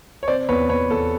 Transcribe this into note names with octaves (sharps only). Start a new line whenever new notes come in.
C#5
C3 C5 D5
E2 B4 C#5
E2 B4 C#5
E2 A4